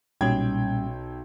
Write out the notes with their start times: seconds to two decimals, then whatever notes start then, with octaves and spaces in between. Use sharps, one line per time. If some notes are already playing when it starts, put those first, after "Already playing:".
0.21 B1 A#2 G3 C#4 G5 G#6